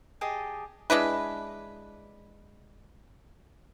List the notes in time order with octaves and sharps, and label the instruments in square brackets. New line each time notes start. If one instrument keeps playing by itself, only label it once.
[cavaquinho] G4 G#4 D#5 A5
[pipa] G#3 D4 E4 B4